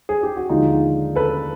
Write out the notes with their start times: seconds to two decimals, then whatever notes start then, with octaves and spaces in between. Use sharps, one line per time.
0.09 G#4
0.23 G4
0.37 F#4
0.49 D#2 D3 F3 G#3 D#4 F4
1.16 A4 B4